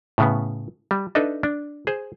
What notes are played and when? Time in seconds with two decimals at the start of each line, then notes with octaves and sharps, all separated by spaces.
0.18 A2 C#3 B3
0.91 G3
1.15 D4 D#4 A4 B4 D#5 E5
1.43 D4
1.87 G#4 C5